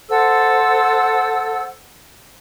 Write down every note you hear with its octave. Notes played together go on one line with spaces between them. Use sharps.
A4 C5 F#5 E6